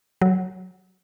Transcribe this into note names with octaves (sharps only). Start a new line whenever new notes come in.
F#3